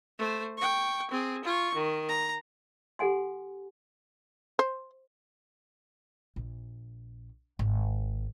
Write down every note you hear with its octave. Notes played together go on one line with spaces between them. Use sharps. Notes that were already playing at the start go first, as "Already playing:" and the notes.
A3 C5
G5 C#6
C4 G#4
F4 C#6
D#3
A#5
G4 A4 F#5 G#5 C6
C5
A#1
G#1